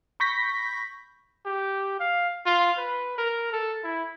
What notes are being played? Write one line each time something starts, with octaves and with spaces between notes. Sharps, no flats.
B5 C#6 G6 A#6 B6
G4
F5
F4
B4
A#4
A4
E4